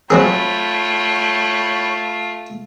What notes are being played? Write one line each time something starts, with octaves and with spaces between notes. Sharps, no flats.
F#3 A3 C4 F4 G#4 C#5 G5 B5